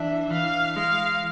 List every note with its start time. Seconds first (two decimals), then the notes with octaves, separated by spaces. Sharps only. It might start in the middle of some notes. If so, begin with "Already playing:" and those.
Already playing: E3 D4 E5
0.31 E3 F5
0.76 G#3 F5